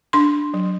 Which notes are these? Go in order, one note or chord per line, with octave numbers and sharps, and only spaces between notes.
D4 C6
F#3